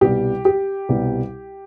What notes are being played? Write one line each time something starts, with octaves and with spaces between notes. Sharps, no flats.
C2 B2 G3 G4
G4
C2 B2 G3